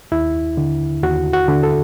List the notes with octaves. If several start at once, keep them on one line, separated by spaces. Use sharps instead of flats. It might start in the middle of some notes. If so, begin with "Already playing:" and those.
D#2 E4
D3
D#2 F#4
F#4
D3
A4